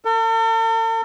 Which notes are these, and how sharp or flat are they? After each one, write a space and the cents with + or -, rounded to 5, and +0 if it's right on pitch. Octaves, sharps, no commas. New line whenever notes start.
A4 +45